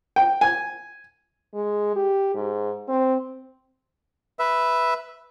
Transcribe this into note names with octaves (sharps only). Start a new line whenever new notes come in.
G5
G#5
G#3
G4
G#2
C4
B4 E5